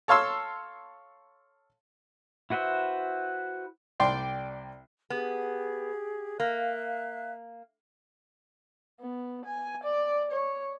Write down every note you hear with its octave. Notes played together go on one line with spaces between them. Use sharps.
A4 C#5 F5 C6 E6
E4 F#4 B4 C5 E5
C2 D5 G5 C6
B3 G4 G#4
A#3 E5 F5 F#6
B3
G#5
D5
C#5